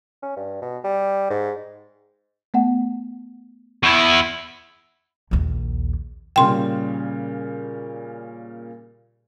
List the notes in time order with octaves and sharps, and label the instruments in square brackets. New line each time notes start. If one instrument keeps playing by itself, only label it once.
[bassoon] C#4
G2
B2
G3
G#2
[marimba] A3 B3 F#5
[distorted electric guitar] E2 E4 [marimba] C#6 G6 G#6
[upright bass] A#1 D#2
[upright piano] A#2 C#3 G3 [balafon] G5 C6